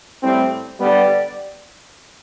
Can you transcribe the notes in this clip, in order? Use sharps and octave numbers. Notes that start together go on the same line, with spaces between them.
A2 G3 C4
D3 G3 B3 D5